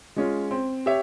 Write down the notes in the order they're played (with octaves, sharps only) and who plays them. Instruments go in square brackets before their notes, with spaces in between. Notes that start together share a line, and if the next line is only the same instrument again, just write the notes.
[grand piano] G#3 C#4 F4
C4
G4 C#5 E5